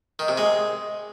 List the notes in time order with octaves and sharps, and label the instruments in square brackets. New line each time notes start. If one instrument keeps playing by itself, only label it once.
[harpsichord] D#3
C3
G#3